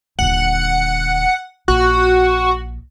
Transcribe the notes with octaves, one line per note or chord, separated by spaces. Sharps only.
D#1 D3 F#5
A#1 F#4